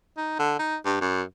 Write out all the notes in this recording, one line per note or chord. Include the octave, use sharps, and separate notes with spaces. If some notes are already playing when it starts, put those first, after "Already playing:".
D#4
D3
D#4
G2
F#2